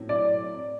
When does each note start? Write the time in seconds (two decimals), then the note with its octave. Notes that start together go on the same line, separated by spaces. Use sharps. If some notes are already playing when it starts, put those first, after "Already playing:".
Already playing: A2 F#3 C4
0.09 D5